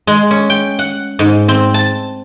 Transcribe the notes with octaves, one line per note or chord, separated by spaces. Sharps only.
G#3
C#4
G5
F#5
G#2
C4
A5